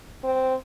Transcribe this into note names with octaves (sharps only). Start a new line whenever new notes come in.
C4